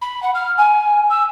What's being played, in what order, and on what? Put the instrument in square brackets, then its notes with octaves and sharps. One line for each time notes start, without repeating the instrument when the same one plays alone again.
[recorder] B5
F#5
F6
G#5
E6